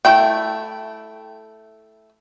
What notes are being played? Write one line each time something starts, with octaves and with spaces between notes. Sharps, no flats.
A3 E4 G5